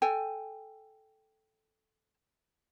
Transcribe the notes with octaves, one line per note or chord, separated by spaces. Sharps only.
A4 G5 G#5